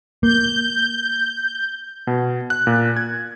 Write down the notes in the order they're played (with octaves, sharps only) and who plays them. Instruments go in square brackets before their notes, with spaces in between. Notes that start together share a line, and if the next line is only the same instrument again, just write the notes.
[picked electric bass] A#3 [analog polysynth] G6
[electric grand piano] B2
F#6
A#2
G#6